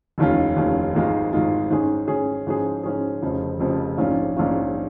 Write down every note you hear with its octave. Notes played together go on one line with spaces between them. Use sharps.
F1 D#2 D#3 C#4 F4
F1 D#2 D#3 C#4 F4
G#1 G#2 D#3 G#3 F4
G#1 G#2 D#3 G#3 F4
G#2 D#3 C#4 G#4
G#2 D#3 C#4 G#4
G#2 F3 C#4 G#4
G#2 F3 C#4 G#4
F1 F2 C#3 F3
F1 F2 C#3 F3
A#1 G#2 D#3 C#4 F4
A#1 G#2 D#3 C#4 F4